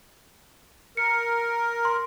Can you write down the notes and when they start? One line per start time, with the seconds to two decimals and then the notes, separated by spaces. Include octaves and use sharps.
0.97 A#4 C#7
1.85 C6